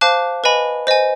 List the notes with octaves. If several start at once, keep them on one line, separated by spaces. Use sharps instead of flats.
C5 F5 A5 D6 F#6
B4 D#5 G#5 B5
C5 D#5 G#5